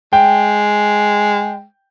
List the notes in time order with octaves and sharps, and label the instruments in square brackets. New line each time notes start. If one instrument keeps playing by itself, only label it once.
[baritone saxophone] G#3 [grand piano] G5